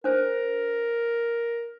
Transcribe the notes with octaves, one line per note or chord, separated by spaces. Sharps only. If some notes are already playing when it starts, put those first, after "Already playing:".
D4 A#4 C5